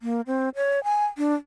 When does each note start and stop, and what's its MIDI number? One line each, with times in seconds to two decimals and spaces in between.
0.02 0.21 58
0.27 0.49 60
0.56 0.83 73
0.84 1.05 80
1.18 1.34 62